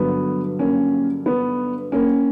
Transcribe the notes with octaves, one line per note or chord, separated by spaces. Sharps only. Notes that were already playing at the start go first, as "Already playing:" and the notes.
Already playing: G2 D3 F#3 B3
A#3 C#4
B3
A#3 C#4